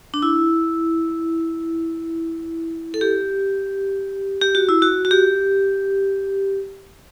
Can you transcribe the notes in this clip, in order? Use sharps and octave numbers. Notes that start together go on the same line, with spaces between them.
D4
E4
A4
G4
G4
F#4
E4
F#4
F#4
G4